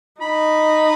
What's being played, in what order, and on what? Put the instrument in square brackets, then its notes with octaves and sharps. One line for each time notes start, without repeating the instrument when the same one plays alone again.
[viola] D#4 [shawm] B5